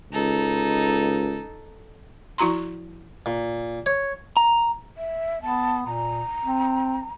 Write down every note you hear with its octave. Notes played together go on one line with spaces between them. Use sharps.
C#2 D#4 A4
F3 E4 F#4 A#5 C6
A#2
C#5
A#5
E5
B3 A5
A#2 A#5
C4